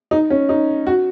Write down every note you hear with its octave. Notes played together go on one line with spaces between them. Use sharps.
D#4
C#4
D#4
F#4